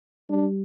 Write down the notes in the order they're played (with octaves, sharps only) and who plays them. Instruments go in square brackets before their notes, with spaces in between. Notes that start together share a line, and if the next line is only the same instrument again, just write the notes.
[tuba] G3 [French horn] D4